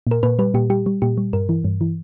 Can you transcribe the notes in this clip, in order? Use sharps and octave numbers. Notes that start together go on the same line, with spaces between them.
A#2 A#4
A#2 B4
G3 B4
A#2 G4
G3 G4
G3
A#2 G4
G3
G2 A#4
E3
G2
E3